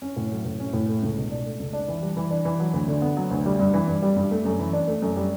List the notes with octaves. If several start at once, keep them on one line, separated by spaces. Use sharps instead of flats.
C#4
A2
F#3
A2
C#4
A2
A3
C#2
B2
D4
A3
C#2
D4
E3
G3
E3
D4
E3
F#3
D2
D3
B3
F#3
D2
G3
G2
E3
G2
G3
G2
A3
F#2
E3
D4
A3
F#2
G3